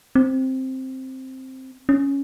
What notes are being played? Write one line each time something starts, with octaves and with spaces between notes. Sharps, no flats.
C4
C#4